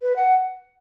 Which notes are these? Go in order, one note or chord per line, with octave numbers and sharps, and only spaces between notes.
B4
F#5